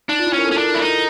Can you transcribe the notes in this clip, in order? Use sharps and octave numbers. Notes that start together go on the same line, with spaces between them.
D4 D#4
F4
E4
C#4
A#4
A4
C#4
D4
A#4
E4
D#4 A#4